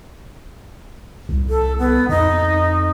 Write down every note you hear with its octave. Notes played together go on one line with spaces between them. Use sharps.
C2
A4
B3
F2 D#4